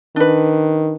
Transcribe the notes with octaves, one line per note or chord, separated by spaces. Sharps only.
D#3 D4 B4